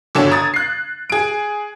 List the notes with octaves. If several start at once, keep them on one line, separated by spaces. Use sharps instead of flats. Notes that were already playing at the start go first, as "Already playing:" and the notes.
G1 D3 F#4 A4 C#5 E7
A#5 D#6 G#6 A6
F#6 C7
G#4 D7